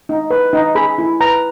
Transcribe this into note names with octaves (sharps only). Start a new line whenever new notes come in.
D#4
B4
D#4
G#4 B5
E4
B4 A#5